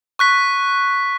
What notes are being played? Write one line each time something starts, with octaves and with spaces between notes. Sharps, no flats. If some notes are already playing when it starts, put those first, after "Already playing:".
C#6 F#6 B6